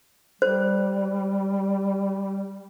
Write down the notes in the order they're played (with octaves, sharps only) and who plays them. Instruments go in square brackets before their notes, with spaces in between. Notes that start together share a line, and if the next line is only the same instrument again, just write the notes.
[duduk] G3 [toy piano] C5